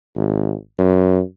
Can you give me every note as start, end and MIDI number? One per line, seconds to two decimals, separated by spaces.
0.16 0.54 32
0.79 1.20 42